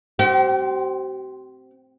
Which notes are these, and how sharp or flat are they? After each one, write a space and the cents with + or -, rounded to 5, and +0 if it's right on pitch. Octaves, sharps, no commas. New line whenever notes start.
C4 +0 G4 -45